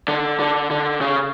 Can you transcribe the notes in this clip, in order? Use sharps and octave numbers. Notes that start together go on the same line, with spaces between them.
D3
D3
D3
C#3